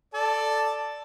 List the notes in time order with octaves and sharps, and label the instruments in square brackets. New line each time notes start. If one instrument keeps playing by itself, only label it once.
[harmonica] A4 D5 A5